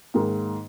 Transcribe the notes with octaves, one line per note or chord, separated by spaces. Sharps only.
G#2 D#3 A#3